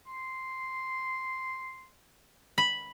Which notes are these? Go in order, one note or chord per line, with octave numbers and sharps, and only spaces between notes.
C6
B5